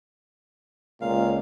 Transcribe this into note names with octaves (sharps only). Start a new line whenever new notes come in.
C#2 A#2 F5